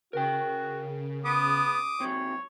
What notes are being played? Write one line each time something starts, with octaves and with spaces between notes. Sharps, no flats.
C#3 F#4 A#4 G5
B3 D6 D#6
C3 F#3 C#5